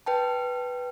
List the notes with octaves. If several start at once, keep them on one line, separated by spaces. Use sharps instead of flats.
B4 G5 A5